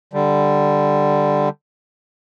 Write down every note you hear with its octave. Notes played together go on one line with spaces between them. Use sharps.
D3 G3